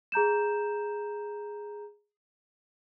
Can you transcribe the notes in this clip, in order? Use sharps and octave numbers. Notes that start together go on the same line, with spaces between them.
G#4 A#5 G6 E7